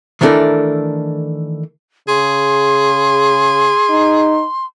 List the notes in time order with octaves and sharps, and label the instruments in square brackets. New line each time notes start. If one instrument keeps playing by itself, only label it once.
[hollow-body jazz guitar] D#3 E3 A3 D4 A4 A#4
[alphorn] C#3 [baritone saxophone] G#4 [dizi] C6
[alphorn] D#4